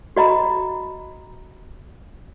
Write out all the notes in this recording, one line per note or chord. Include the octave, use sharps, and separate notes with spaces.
F#4 D#5 A#5 B5